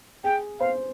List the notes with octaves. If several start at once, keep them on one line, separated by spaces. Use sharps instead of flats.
G#4 G5
C5 F5